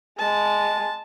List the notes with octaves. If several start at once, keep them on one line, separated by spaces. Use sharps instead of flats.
G#3 A5